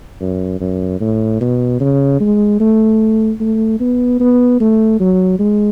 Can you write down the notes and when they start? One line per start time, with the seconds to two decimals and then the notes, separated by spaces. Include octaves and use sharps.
0.21 F#2
0.60 F#2
1.01 A2
1.41 B2
1.80 C#3
2.21 G#3
2.60 A3
3.40 A3
3.80 B3
4.20 B3
4.60 A3
5.00 F#3
5.39 G#3